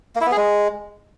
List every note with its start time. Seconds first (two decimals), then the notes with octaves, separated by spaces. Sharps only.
0.16 A#3
0.21 E4
0.26 B3
0.32 G#4
0.37 G#3